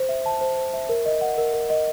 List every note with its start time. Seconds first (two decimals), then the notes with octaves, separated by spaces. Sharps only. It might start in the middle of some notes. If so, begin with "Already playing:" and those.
Already playing: C5
0.09 E5
0.26 A5
0.41 C5
0.58 C5
0.74 E5
0.89 A#4
1.06 D#5
1.21 F#5
1.38 A#4
1.54 A#4
1.70 D#5